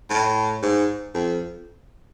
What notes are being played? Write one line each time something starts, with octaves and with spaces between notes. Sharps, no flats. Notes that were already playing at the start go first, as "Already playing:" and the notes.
A2
G#2
F2